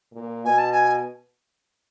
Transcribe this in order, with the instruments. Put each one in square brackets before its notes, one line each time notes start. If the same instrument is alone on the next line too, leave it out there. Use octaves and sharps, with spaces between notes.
[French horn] A#2
[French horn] B2 [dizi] G#5
[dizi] A5
G#5